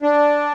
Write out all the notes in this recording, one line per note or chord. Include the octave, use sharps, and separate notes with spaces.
D4